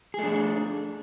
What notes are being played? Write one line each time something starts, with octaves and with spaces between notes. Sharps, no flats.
A3 D4 G#4